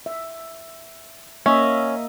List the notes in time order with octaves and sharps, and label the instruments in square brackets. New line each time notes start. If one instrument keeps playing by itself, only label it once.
[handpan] E5
[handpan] A#3 D#5 E5 [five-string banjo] C#4